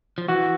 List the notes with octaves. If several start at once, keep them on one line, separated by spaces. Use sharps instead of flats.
F3
E3 F#4